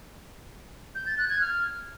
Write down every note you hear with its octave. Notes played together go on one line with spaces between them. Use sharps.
G6
A6
F#6
G#6
F6